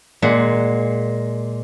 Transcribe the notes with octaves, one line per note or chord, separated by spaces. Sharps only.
A#2 G#3 F#5